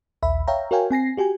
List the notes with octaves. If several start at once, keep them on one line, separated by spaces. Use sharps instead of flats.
A#1 D#2 E5 B5
C#5 E5 F5 G5 A#5
F#4 A#4 C#5 F5 G5 G#5
C4 G#5 A#6 C7
F#4 G4 G5 G#5